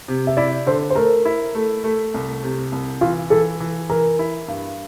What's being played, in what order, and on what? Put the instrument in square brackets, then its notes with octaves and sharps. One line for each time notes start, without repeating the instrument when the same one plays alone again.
[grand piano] C3
[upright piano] E5
[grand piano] E4 [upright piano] D5
[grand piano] D3 [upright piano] C5
[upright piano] C5
[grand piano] A3 [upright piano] A#4
[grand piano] E4
A3
A3
C2
C3
C2
[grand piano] E3 [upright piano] F4
[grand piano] E3 [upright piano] A4
[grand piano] E3
[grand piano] E3 [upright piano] A#4
[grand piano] E4
G2